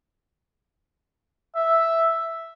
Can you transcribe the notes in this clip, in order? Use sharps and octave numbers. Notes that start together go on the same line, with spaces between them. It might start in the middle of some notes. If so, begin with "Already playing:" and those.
E5